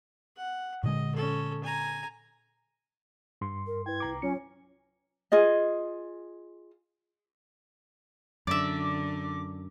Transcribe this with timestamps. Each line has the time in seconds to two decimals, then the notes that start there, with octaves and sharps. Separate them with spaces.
0.37 F#5
0.84 A#2 D3 G#3 D#5
1.15 C#4 A4
1.64 G#5 A#5
3.41 G2 C6
3.67 A#4
3.86 E4 B4 G5 G#6
4.00 C2 A#5 D6
4.22 F#3 C#4 F4 C#5 C#7
5.32 F4 G#4 D#5
8.47 F#2 D3 D5 E5 D6